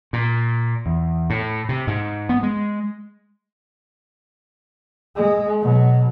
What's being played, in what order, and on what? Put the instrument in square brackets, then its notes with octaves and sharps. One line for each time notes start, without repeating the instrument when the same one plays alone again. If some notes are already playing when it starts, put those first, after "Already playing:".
[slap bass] A#2
E2
A2
C3
G#2
B3
G#3
[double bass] G#3
B2 F#3